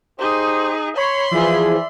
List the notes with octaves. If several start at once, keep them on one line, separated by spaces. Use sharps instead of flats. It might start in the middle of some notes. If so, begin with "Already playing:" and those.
D#4 G4 G#4 C5
C#5 B5 C6
E3 F3 G#4 D5 E5